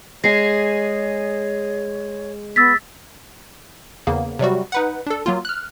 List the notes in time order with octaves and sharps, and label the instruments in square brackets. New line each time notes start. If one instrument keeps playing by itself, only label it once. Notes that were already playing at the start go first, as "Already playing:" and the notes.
[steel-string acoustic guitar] G#3 G#4 [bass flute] C#5 [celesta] A#6 C7
[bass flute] B3 [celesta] E6 A6 B6
[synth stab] E2 C#3 A#3 B3
C3 F#3 G3 F#4
D#4 B4 F#5
D4 A4
F#3 A#3 F4
F6 F#6